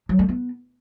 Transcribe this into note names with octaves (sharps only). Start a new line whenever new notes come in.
F#3
A3
B3